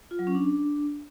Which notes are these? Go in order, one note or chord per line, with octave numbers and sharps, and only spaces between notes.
F4
F#3
C#4
D4